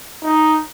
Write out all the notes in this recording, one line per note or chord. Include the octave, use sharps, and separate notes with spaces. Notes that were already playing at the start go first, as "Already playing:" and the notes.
D#4